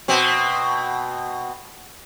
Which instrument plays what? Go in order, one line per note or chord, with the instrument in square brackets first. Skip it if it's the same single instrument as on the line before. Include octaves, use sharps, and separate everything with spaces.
[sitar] B2 C4